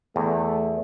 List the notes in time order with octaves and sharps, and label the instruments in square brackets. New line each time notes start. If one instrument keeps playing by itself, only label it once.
[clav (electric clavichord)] E2 [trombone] A3